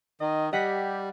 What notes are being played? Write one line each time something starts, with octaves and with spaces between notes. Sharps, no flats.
D#3 D#5
G3 G4 D#5 F#5 B6